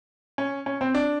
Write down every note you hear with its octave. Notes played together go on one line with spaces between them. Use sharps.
C#4
C#4
C4
D4